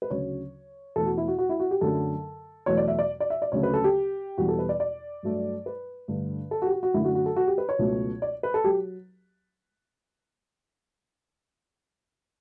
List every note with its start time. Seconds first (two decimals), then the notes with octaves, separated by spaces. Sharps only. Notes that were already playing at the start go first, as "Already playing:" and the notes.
0.02 B4
0.10 D2 C#3 F#3 C#5
0.96 E2 B2 A3 A4
1.06 F#4
1.17 E4
1.28 F#4
1.39 F#4
1.49 E4
1.60 F#4
1.71 G4
1.81 F#2 D3 F#3 A3 A4
2.66 E2 B2 F#3 A3 C#5
2.77 D5
2.88 E5
2.99 D5
3.20 D5
3.30 E5
3.42 D5
3.52 D2 C#3 F#3 A3 C#5
3.63 B4
3.74 A4
3.84 G4
4.38 E2 B2 G3 F#4
4.48 A4
4.59 B4
4.69 D5
4.80 D5
5.23 G2 F#3 A3
5.66 B4
6.08 G2 D3 A3
6.51 A4
6.62 F#4
6.67 G4
6.73 F#4
6.83 F#4
6.94 F#2 D3 F#3 A3 E4
7.05 F#4
7.15 F#4
7.26 A4
7.36 F#4
7.48 G4
7.58 B4
7.69 C#5
7.79 C#2 B2 F#3 A3
8.22 D5
8.43 B4
8.54 A4
8.64 F#3 G4